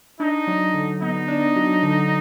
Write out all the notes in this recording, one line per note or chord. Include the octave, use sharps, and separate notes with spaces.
D4 D#4
F#3
D3
B3 D#4
D4
F#3
D3